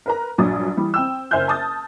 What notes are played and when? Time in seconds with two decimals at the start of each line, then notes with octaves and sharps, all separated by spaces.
0.06 A#4 B4 A#5
0.38 A#1 G2 F#3 D#6 A6
0.77 E3 G3
0.94 C4 G5 E6
1.31 F#1 C5 E5 G#5 F6 G6
1.48 A5 D#6 A6